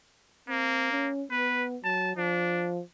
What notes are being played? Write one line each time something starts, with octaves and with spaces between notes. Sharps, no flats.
A#3 C4
C#4
B3 B4
F#3 A5
F3 D4